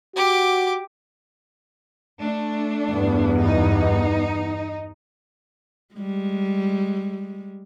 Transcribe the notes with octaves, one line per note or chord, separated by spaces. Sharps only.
F#4 G4 D6
A3 D4
E2 G2 B3
D#4
G3 G#3